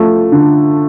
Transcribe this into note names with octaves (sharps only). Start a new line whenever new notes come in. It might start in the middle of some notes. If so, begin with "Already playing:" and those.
Already playing: F3 A3
D3